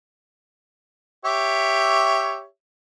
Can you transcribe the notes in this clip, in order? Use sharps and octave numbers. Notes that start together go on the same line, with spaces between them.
G4 C#5 E5